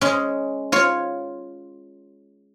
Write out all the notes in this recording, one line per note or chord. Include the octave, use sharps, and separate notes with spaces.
G#3 C#4
F4 C#5